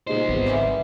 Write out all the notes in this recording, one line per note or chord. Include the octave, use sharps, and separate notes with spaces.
C2 A#2 G#3 D#4 C5
G#1 B3
D#3 E3 G3